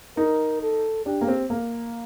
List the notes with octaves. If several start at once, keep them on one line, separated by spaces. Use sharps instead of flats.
D#4 A#4
A4
D4 G4
A#3
C4
A#3